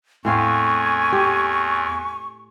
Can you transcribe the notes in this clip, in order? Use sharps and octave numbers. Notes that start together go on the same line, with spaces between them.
E2 A2 C4 F5 G#5 C#6
G4